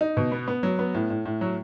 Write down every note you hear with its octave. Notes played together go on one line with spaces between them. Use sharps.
D#4
B2
B3
B3
F#3
B3
A2
A2
A2
F#3